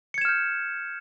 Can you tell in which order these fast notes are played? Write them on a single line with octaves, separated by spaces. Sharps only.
C#7 G#6 E7 F6 G6